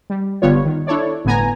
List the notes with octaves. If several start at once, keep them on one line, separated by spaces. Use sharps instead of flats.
G3
G1 D3 G3 B3 F4 C#5
D#3
D4 E4 A4 C#5 D5
G1 A2 B3 G#5 A#5